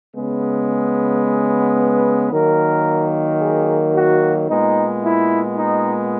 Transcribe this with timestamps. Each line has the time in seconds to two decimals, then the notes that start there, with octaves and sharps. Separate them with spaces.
0.15 C#3 G#3 B3
1.77 B4
2.32 D#3 F#3 A#3 A#4
3.39 G#4
3.94 F#4
4.48 A#2 G#3 B3 D#4
5.02 E4
5.56 D#4